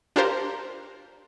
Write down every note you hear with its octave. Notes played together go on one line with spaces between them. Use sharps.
D4 F4 G4 A#4 C5